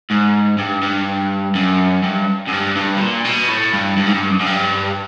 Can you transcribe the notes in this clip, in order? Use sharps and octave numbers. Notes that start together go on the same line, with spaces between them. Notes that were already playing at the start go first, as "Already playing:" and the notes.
G#2
G2
G2
F#2
G2
F#2
G2
G2
B2
A#2
B2
A2
G2
G2
G#2
G2
F#2
F#2
G2